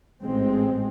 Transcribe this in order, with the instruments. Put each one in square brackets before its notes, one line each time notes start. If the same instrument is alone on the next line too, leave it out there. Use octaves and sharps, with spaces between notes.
[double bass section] A1 G#2 G#3 C4